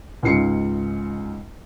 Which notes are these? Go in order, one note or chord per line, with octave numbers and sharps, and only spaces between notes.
C#2 G#2 F4 C7 C#7